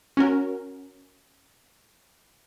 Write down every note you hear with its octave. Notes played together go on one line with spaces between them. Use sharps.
C#4 F#4 A#4